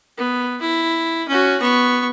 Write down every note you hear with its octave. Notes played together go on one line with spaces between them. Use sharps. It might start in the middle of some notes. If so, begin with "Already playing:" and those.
B3
E4
C#4 F#4
B3 C#6